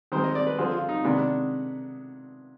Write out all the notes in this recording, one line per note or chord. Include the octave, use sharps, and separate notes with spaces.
D#3 G#3 C4 C5
D#5
D5
B4
D3 F3 C4 G#4
F4
D#4
C3 D#3 G#3 B3 D4
D4